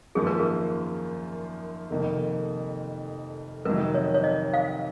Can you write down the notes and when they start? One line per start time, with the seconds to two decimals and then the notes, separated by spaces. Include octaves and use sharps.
0.15 G#1 F#2 F3 A#3 F4 G#4
0.27 A#4
0.39 G#4
1.90 F1 F2 D#3 A#3
3.65 F2 C3 D#3 F#3 A#4
3.95 C#5
4.14 C#5
4.24 D#5
4.54 F5